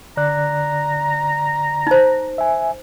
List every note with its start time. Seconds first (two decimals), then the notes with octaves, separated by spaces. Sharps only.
0.17 D3 D5 A#5 F#6
1.87 D#4 C5
2.38 E5 G#5